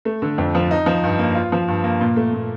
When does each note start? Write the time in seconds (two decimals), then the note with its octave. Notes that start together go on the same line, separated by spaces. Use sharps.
0.05 A3
0.22 D3
0.38 F2
0.55 F3
0.71 D#4
0.86 F3
1.04 G2
1.19 A#3
1.35 F4
1.52 F3
1.68 G2
1.84 A#3
2.01 A#2
2.16 A3
2.33 A#2